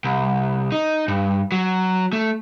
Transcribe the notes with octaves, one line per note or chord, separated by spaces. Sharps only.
C2
D#4
G2
F#3
A3